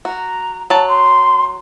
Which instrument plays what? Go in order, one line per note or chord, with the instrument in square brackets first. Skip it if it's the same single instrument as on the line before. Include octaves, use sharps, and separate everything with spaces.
[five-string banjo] F#4 [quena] A#5
[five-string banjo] F#3 A5
[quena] C6